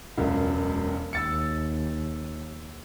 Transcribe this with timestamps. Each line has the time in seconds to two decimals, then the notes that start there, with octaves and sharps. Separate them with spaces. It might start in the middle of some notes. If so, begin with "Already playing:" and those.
0.18 E1 C#2 F#2
1.13 D#2 E6 A6 C#7